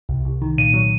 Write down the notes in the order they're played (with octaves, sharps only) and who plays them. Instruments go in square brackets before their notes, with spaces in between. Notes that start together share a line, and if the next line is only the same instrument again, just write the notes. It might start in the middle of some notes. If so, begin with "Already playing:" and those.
[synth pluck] C2
C2
D#3
[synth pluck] A#2 [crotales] D#7
[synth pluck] F#3